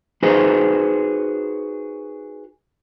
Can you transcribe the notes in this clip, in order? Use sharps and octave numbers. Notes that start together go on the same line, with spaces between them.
D#4 F#4 G#4 B4 C5